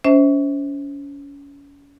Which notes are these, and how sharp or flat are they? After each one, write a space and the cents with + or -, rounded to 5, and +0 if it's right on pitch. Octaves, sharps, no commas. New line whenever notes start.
C#4 +35 C5 +0 E5 -30